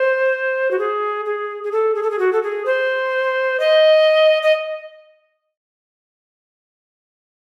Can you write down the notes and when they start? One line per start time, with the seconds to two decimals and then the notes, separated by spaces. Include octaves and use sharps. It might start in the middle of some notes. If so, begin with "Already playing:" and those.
Already playing: C5
0.71 F#4
0.79 G#4
1.25 G#4
1.64 G#4
1.72 A4
1.95 G#4
2.03 A4
2.11 G#4
2.19 F#4
2.33 A4
2.43 G#4
2.66 C5
3.60 D#5
4.43 D#5